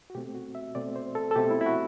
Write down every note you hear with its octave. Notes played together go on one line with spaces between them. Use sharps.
F#4
B2 A3 C4 G4
F#4
E5
B2 A3 C4 D5
C5
A4
A4
B2 A3 C4 G4
E4
E4
F#4